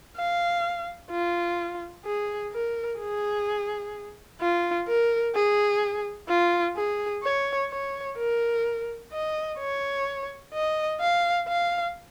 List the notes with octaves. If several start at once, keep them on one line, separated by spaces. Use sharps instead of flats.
F5
F4
G#4
A#4
G#4
F4
A#4
G#4
F4
G#4
C#5
C#5
A#4
D#5
C#5
D#5
F5
F5